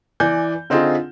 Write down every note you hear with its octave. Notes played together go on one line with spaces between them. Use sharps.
E3 D5 G#5 G6
D3 C4 D#4 F4 G#4